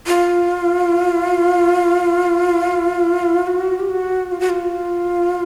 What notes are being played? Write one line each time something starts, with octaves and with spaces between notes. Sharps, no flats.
F4
F#4
G4
F#4
F4
F#4
F4